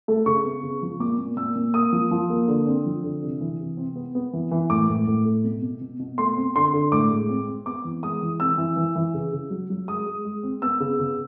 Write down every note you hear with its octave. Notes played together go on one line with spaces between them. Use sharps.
A3
C#3 C#6
B3
C#3
F3
A#2 D6
A#2
A#2 E6
A#2
A#3 D#6
F3
F3
A#3
D3
C4
F3
D3
C3
E3
C3
C4
B3
B3
E3
E3
A2 D6
A2
A2
A3
B2
B2
B2
B2
A3 C6
C4
D3 C6
D3
A2 D6
G#3
C4
C4
B3 D6
E3
G#3 D#6
E3
C4 E6
E3
E3
E3
C#3
C#3
F#3
F#3
G#3 D#6
G#3
G#3
C4
B3 E6
C#3
C#3